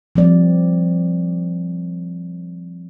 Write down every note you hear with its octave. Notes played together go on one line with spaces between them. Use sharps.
F3 G3 C4 D5